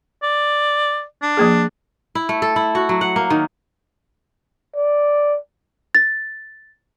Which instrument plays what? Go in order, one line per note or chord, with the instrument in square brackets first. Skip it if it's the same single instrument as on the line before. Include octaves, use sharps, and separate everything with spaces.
[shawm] D5
D4
[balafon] F3 A#3 G#4
[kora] E4
A3
A4
E4
F#4
F#3
F#5
A#3
D#3
[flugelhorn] D5
[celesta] A6